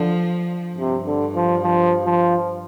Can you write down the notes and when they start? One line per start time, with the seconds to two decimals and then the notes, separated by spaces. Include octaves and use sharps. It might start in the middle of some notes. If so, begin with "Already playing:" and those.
Already playing: D3 F3
0.77 G2 C3
1.06 D3
1.35 F3
1.63 F3
2.05 F3